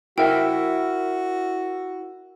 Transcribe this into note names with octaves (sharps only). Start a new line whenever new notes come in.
E4 F#4 A#4 E5 G5